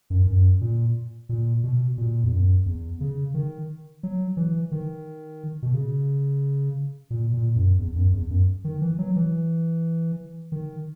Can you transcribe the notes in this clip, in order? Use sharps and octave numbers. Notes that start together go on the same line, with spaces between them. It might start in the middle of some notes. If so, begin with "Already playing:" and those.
F#2
F#2
A#2
A#2
B2
A#2
E2
F#2
E2
C#3
D#3
F#3
E3
D#3
B2
C#3
A#2
A#2
F#2
E2
F#2
E2
F#2
D#3
E3
F#3
E3
D#3